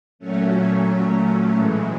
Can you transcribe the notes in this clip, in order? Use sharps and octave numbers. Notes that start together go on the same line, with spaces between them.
A#2 F#3 A3 C#4
A2 E3 G#3